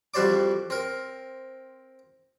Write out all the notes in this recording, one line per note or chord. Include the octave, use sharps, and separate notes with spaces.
F2 G3 F#4 C5 D5 D6
C4 A#4